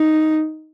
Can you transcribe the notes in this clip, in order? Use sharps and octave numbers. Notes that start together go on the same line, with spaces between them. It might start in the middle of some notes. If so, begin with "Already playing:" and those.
Already playing: D#4